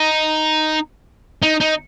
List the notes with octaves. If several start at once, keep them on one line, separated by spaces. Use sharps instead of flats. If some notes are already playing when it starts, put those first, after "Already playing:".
Already playing: D#4
D#4
D#4